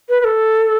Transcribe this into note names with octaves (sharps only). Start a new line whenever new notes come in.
B4
B4
A4